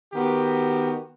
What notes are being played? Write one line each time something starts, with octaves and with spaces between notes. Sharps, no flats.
D#3 B3 F#4 G4